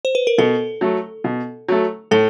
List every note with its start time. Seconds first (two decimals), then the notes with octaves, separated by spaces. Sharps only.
0.05 C5
0.15 B4
0.27 A#4
0.38 B2 A4
0.81 F#3 A3
1.24 B2
1.69 F#3 A3
2.11 A2 A4